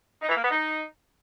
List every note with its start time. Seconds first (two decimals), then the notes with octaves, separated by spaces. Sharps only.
0.21 D#4
0.29 E3
0.36 A#3
0.43 B3
0.51 D#4